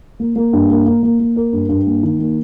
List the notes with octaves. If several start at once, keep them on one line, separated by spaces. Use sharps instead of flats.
A#3
A#3
G2
A#3
A#3
A#3
A#3
A#4
G2
G2
A#3
D#3
A#3